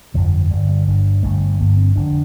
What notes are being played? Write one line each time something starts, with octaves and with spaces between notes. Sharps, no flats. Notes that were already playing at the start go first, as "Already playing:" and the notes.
G1 F2 D3 F3
G1 G2 D3 G3
G3
G1 G2 D3
G1 G2 D3 A3
G1 G2 D3 A#3
C4
F1 F2 D3 D4